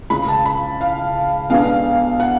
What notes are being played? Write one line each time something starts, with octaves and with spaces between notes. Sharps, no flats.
C#2 C#3 G#3 B5
A5
B5
F5
B1 B2 G#3 B3 D4 F5
F#5